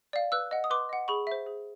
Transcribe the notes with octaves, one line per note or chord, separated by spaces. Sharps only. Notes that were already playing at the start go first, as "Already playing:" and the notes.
D5 F5
B4 E6 F#6
D#5 F#5
D#6
B4 C6 D6
D#5 F#5
G#4 B5 C#6
C5 E5
G#4